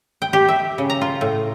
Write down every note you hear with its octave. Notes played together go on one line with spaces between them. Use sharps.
G5
G4
E5
C#3
A#5
F4
A2